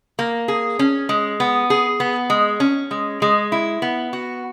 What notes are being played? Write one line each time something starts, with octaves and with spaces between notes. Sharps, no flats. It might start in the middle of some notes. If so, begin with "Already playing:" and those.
A#3
G#4
C#4
G#3
B3
G#4
B3
G#3
C#4
G#3
G#3
E4
B3
F#4